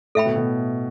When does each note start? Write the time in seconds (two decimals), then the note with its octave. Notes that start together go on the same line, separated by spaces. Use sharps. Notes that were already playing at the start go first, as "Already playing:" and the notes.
0.15 A2 A4 E5 G5 B5
0.26 B2
0.36 B2